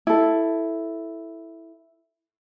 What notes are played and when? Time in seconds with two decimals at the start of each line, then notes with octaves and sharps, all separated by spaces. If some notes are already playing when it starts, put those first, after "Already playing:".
0.07 E4 A4